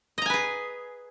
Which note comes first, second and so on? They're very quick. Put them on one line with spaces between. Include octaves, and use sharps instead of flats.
D#5 A#5 G#5 B4 G#4